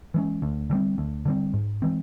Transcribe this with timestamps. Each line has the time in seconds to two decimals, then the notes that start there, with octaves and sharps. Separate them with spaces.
0.14 E3 G#3 C#4
0.42 D2
0.70 D3 G3 C4
0.98 D2
1.25 D3 G3 C4
1.53 G#2
1.82 E3 G#3 C4